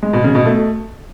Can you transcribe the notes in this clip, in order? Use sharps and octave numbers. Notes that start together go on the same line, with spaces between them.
G#3
B2
C#3
B2
A3